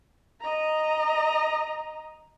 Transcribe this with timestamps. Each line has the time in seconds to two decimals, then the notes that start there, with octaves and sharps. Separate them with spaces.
0.41 D#5 A#5